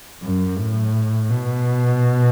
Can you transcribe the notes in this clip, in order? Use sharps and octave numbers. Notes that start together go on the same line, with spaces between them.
F#2
A2
B2